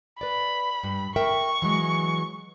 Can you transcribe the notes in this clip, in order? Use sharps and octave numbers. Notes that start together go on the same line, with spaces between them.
B4 D5 B5
G2
A#4 E5 G5 C#6
E3 F#3 G#3